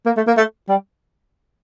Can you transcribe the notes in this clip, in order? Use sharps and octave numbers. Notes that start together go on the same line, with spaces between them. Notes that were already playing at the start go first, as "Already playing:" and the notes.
A#3
A3
A#3
A3
G3